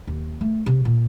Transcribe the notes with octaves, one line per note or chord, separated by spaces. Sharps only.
D#2
A3
C3
A#2